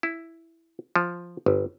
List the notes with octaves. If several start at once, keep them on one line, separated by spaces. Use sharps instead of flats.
E4
F3
G1